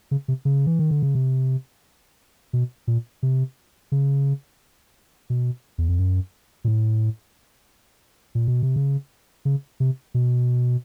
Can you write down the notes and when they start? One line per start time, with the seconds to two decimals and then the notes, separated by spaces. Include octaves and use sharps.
0.11 C#3
0.28 C3
0.45 C#3
0.67 E3
0.79 D#3
0.91 D3
1.02 C#3
1.15 C3
2.53 B2
2.87 A#2
3.23 C3
3.92 C#3
5.30 B2
5.78 E2
5.89 F2
5.99 F#2
6.64 A#2
6.68 A2
8.35 A#2
8.48 B2
8.63 C3
8.76 C#3
9.45 C#3
9.80 C3
10.14 B2